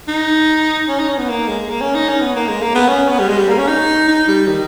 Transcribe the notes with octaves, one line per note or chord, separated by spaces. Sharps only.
D#4
C#4
D#4
C#4
B3
A#3
G#3
A#3
C#4
D#4
C#4
B3
A#3
G#3
A#3
B3
C#4
B3
G3
G#3
G3
A#3
C#4
D#4
D#4
G3
D#3